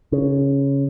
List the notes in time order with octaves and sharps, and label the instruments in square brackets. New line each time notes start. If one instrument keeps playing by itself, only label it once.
[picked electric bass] C#3